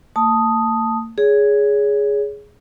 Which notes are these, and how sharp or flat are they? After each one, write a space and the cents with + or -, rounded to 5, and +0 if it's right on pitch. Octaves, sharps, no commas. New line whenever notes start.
A#3 -45 A5 +0 D#6 +0
G#4 +0 C#5 +30